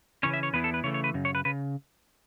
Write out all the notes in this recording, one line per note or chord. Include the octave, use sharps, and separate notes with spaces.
C#3 E3 C#4 C#5
E5
C#5
E2 E3 B3 E4 B4
A4
B4
C#3 E3 A3 C#5
C#5
B4
F#2 C#3
C#5
B4
C#3 B4